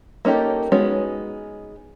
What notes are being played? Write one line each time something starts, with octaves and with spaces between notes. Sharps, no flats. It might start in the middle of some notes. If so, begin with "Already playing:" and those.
A#3 C#4 D#4 G4 A4
G#3 B3 C#4 D#4 F#4